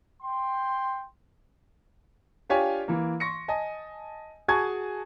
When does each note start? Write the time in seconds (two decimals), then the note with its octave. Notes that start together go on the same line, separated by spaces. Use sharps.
0.22 G5 C6
2.49 D4 F4 G4 C#5 D5 G#5
2.88 E3 A#3
3.20 C6 C#6 A#6 C#7
3.48 D#5 G#5 A5
4.48 F#4 G#4 G#5 A5 C#6 G#6